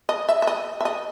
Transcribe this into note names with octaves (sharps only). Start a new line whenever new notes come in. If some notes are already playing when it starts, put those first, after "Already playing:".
D#5
E5
E5
D#5
E5
D#5